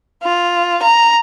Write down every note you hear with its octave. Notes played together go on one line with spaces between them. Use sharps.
F4
A#5